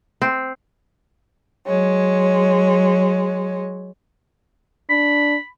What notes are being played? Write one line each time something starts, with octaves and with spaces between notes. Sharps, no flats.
C4
F#3 G#3 C#5
D4 B5